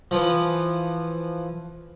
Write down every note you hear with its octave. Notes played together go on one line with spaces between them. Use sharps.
E3 F3